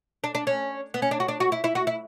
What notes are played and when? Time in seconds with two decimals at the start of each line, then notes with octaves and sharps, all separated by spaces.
0.24 D4
0.35 D4
0.47 C#4
0.94 B3
1.02 C#4
1.11 D4
1.20 F#4
1.28 D4
1.40 F#4
1.52 E4
1.64 E4
1.75 F#4
1.87 E4